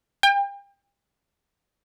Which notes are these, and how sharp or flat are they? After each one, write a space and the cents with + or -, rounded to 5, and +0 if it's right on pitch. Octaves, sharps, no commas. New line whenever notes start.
G5 +35